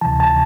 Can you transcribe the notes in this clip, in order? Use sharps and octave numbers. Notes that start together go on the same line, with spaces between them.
D2 C3 E3 A5
A5